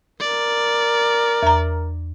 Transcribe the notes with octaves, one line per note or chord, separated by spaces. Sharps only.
A#4 D5
E2 A#5